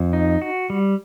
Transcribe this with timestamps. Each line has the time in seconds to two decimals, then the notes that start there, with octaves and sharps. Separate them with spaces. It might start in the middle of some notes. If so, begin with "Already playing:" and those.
Already playing: F2
0.13 D#4
0.42 F#4
0.70 G3